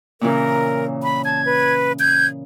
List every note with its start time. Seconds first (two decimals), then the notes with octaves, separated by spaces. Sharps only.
0.21 A#2 C#3 E3 A#4
1.03 B5
1.25 A5 G#6
1.45 B4
2.00 G6 G#6